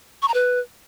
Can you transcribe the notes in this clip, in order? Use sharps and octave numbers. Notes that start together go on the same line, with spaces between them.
C#6
A#5
B4